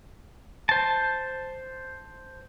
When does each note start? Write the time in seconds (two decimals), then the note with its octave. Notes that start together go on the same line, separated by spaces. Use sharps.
0.69 C5 A5